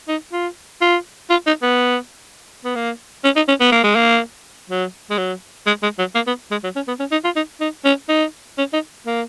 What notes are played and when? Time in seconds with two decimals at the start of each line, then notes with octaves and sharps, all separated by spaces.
0.08 D#4
0.33 F4
0.81 F4
1.30 F4
1.47 D#4
1.62 B3
2.65 B3
2.75 A#3
3.24 C#4
3.36 D#4
3.48 C#4
3.60 B3
3.72 A#3
3.84 G#3
3.95 A#3
4.70 F#3
5.10 G#3
5.18 F#3
5.67 G#3
5.83 G#3
5.99 F#3
6.15 A#3
6.27 B3
6.51 G#3
6.64 F#3
6.76 C#4
6.88 B3
7.00 C#4
7.11 D#4
7.24 F4
7.36 D#4
7.60 D#4
7.85 C#4
8.09 D#4
8.58 C#4
8.73 D#4
9.06 A#3